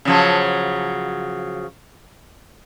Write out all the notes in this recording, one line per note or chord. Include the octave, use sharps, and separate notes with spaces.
C#3 F3 F#3